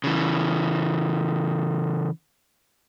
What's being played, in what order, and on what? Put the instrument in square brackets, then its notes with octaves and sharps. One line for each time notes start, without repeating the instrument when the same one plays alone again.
[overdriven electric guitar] C#3 E3